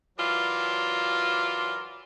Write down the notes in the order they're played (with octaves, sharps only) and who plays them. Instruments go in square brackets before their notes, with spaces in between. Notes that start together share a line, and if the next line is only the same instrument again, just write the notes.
[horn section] E3 F#3 F4 A#4 D5